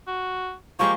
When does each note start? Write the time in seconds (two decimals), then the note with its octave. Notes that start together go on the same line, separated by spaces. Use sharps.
0.07 F#4
0.79 F3 G#3 A#3 G4 C#6